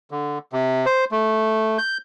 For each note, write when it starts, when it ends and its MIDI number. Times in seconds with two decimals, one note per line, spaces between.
0.11 0.38 50
0.53 0.86 48
0.86 1.05 72
1.11 1.78 57
1.78 1.98 91